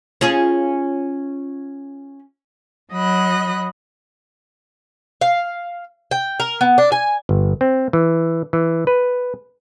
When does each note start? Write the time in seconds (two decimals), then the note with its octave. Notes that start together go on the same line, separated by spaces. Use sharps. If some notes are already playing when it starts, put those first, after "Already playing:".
0.21 C#4 F4 G#4
2.92 F#3 D#5 B5 F#6
5.21 F5
6.11 G5
6.40 A#4
6.61 B3
6.78 D4
6.92 G#5
7.29 G1
7.61 C4
7.93 E3
8.53 E3
8.87 B4